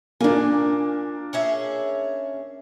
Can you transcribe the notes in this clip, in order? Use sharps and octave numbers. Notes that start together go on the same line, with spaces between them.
A#2 A#3 D4 G#5
C#4 G#4 E5